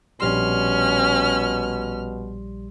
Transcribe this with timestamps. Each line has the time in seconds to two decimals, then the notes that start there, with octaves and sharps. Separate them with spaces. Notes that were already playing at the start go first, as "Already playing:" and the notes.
0.20 A#1 B2 G3 C#4 C6 F6